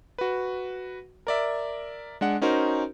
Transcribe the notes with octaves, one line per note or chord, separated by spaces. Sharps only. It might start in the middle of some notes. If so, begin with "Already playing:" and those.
F#4 B4
A#4 D5 E5
G#3 D4 F#5
C#4 D#4 F#4 A#4 C5